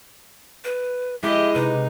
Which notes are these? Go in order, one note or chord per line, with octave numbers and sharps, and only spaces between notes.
B4
G#3 E4 G4 D#5 E5
C3 D#4 B4